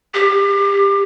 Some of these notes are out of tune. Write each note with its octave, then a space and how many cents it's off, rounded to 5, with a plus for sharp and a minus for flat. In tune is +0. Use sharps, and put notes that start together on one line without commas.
G4 +25